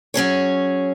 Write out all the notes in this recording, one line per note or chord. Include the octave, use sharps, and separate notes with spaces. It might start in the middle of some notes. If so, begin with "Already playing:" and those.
F#3 C#4 G#4 C#5